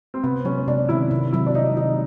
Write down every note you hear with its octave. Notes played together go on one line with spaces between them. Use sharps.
C4
C3 B3
F#3 C#4
C3 D4
D#3 E4
C3
F#3 E4
D4
C3 D#4
D#3 D#4